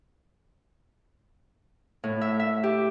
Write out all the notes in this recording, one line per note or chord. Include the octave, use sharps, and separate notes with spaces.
A2
E5
E5
G4